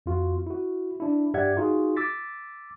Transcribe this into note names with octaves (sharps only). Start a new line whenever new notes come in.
F2 F4 F#4
E4 F#4
D4 E4
G2 G4 D5 E5 F#5 G#6
D#4 F4 F#4 G#4
D6 E6 A6 B6